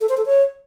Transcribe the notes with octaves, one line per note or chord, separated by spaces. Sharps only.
A4
C5
A4
C#5